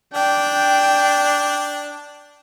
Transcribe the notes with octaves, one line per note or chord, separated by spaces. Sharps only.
D4 G5